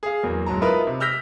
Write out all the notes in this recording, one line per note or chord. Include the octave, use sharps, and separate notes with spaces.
G#4 F5
E2 F#3 A#3
D1 G#2 F#3 A5 A#5
B3 D#4 F4 A#4 B4 E5
C3
E6 F6 G6 A#6 B6 F7